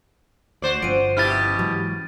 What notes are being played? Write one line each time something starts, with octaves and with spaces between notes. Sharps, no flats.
D2 F#4 C5 D5
G1 F3 C4 C#4 D7 D#7
B2 E4 G4 F6 A6
G#2 C#3 E3 F#3